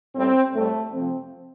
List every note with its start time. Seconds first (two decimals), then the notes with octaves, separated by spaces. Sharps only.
0.14 A2 G3 C4
0.53 A2 G3 A3
0.91 F2 C3 F3 C4